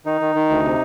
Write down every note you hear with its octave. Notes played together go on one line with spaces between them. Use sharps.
D#3 D#4
D#3
D#3
D2
C3